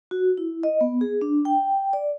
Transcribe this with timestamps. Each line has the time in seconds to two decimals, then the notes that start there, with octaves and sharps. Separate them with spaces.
0.11 F#4
0.38 E4
0.63 D#5
0.81 B3
1.01 G#4
1.21 D4
1.45 G5
1.93 D5